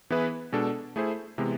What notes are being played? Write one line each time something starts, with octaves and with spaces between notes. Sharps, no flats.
E3 B3 E4 G#4 B4
B2 G#3 D4 A4
A3 E4 G#4 C5
C3 E3 G#3 B3